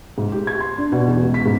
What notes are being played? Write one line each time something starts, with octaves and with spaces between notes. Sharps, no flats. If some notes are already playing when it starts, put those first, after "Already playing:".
G#2
G4
G#6
C6
D4
B2
E2
C#2
B6
G#2